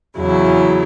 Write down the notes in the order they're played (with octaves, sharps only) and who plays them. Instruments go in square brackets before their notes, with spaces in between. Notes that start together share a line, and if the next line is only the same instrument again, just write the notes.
[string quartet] E2 C#3 F#3 E4